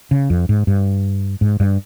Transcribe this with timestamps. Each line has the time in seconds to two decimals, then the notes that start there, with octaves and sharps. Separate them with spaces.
0.11 C#3
0.30 F2
0.49 G#2
0.67 G2
1.41 G#2
1.60 G2